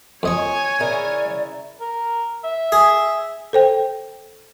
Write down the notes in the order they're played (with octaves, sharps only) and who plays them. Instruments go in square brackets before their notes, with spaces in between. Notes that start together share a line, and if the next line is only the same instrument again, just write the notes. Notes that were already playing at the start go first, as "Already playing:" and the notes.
[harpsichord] F2 D#5 C#6 [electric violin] C#5 G#5
[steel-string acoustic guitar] C#3 E4 A#4 [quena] D5
[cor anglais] A#4
E5
[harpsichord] G#4
[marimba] A4 C5 G5